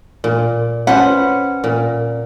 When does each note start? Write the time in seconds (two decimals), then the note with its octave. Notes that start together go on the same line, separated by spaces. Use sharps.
0.24 A#2
0.87 C#4 B4 C5 F#5
1.64 A#2